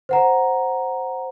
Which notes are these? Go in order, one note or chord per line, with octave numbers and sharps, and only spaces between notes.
C5 F#5 A#5